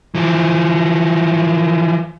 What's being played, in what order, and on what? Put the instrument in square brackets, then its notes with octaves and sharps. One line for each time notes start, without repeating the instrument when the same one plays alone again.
[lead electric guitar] E3 F3